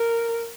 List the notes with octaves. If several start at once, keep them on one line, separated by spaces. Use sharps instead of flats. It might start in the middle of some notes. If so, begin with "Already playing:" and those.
Already playing: A#4